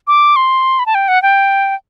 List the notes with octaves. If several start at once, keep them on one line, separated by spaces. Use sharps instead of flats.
D6
C6
B5
A5
G5
F#5
G5